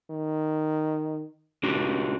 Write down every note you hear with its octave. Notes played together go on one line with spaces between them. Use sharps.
D#3
C#2 D4 F#4 G4